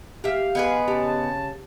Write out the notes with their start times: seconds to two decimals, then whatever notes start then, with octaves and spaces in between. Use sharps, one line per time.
0.24 G4 E5 F5
0.55 G#3 B3 G#4 B4
0.88 C#3 G4 A5